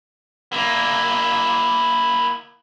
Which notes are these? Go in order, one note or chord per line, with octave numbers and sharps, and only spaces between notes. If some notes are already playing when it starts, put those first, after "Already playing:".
A#3 E4